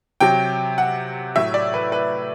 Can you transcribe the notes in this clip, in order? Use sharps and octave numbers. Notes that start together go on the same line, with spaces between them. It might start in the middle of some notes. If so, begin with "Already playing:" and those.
C3 F#3 G5
F#5
A2 F#3 E5
D5
B4
B4